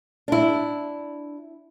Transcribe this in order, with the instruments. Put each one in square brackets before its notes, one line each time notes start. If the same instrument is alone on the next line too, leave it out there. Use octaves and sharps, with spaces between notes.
[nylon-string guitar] D4 E4